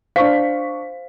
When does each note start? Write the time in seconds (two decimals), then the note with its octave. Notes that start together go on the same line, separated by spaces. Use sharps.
0.16 D4 C5 F5 C#6 B6